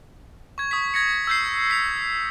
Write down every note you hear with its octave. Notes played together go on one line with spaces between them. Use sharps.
C#6 G#6
C#6 D#6 G#6 B6
G#6 A#6 C#7
E6 G6 C7
B6 C7 F7